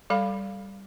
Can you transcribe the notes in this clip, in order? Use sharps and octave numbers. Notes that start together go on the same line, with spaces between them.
G3 A4 F5 B5